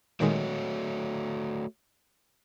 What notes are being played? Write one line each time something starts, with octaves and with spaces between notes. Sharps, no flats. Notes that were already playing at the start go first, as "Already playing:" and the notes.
A#2 D#3 G#3 A3 F#4 C#5